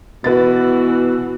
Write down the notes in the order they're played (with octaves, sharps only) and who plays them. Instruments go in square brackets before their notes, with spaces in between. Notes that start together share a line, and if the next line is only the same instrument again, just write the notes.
[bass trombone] B2 [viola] E3 F#4 [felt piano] B4 A6